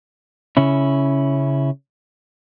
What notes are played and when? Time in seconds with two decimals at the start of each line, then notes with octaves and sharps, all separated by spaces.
0.57 C#3 C#4 E4